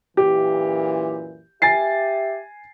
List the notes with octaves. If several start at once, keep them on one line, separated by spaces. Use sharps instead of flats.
F#2 A#2 E3 G4
G4 E5 G#5 A6 C7